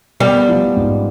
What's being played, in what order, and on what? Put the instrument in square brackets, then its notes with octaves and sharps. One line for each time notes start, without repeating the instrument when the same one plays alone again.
[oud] G3 [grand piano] B3
[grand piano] F3
G#2